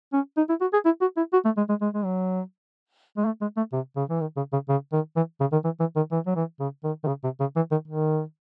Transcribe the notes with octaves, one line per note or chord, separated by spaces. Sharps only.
C#4
D#4
E4
F#4
G#4
E4
F#4
E4
F#4
A3
G#3
G#3
G#3
G#3
F#3
G#3
A3
G#3
A3
C3
C#3
E3
D#3
C#3
C#3
C#3
D#3
E3
C#3
D#3
E3
E3
D#3
E3
F#3
E3
C#3
D#3
D#3
C#3
C3
C#3
E3
D#3
D#3